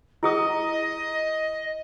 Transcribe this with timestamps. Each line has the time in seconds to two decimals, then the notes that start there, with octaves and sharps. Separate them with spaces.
0.23 E4 G#4 D#5 D#6